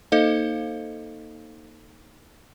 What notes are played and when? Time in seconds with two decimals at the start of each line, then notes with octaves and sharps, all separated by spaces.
0.12 A#3 D#4 A4 C5 D#5 F5